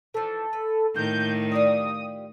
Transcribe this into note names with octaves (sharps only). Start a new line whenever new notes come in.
E3 F3 A4
B4
A2 D#3 A#3 G6
F4 G4 D5 D#6